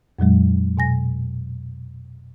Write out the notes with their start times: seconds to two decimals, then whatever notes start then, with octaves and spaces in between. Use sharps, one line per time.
0.19 F2 A#2 F#3 G#3
0.77 B2 G#5 A#6